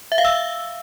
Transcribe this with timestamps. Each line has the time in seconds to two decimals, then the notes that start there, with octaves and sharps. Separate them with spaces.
0.12 E5
0.18 F5
0.25 E6